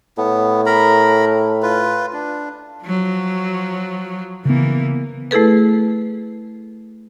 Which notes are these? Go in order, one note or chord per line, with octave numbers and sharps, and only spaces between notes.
A2 B3
A#4 A#5 B5
F4 B4
D4
F3 F#3
C#3 E3 A#3 B3
A3 E4 G#4 A4 B4